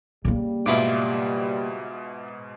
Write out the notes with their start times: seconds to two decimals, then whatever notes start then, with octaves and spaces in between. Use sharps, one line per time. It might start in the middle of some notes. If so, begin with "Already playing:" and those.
0.25 C#3 G3 A#3
0.66 G#2 B2 E4 F4 D6